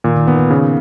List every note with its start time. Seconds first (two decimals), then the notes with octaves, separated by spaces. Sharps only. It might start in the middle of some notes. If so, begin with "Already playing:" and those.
0.04 A#2 D#3
0.16 D#3
0.27 D#3 B3
0.39 D#3
0.50 C#3